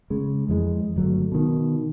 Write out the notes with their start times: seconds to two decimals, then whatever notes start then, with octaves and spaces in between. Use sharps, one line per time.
0.10 C#3 G#3
0.49 F2 E3 G#3
0.96 G1 F#3 A3
1.32 B2 D#3